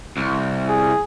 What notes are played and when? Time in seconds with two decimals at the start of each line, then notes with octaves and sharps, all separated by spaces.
0.17 C2
0.69 G#4